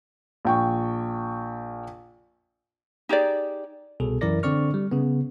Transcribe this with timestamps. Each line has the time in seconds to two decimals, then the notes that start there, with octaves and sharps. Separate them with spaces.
0.45 A#1 G5 C#6
3.09 D#4 G4 G#4 D5
4.00 C2 B2 G#4 A4
4.21 F#2 E3 E4 A#4 D5 A#6
4.43 D3 C4 D5 C#6 F6
4.74 G3
4.91 C#3 B3